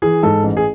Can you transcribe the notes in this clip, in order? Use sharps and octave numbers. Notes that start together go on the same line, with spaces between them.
E3 G#4
G#2 A4
A1
G#4